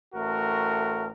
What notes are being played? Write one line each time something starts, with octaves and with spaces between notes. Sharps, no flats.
A1 A3 F#4 A#4